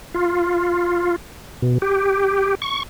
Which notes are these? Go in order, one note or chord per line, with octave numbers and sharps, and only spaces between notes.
F4
B2
G4
C#6